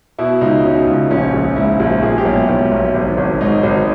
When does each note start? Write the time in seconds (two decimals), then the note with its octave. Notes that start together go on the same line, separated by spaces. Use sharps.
0.18 B2 E4
0.41 C#2 D#4
0.64 B2 C#4
0.87 C#2
1.11 A#1 C#4
1.33 A#1
1.56 G#2 E4
1.80 A#1
2.03 A#2 G#4
2.18 G4
2.25 B1
2.33 E4
2.49 B1
2.72 B1
2.94 G#1
3.17 G#1
3.41 G#2 D#4
3.63 G#1